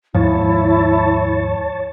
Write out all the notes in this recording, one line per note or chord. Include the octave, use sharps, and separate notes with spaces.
D#2 G#2 F3 E4 C#5 A5